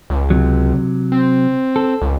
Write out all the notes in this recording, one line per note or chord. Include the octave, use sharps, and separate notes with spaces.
C#2
C3 F#3
C4
A4
C#2